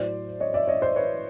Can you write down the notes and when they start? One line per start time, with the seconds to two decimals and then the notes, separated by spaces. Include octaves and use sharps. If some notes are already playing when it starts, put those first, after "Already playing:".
Already playing: A2 F#3 C5 D5
0.40 C#5 D#5
0.54 D5 E5
0.67 C#5 D#5
0.82 C5 D5
0.96 B4 C#5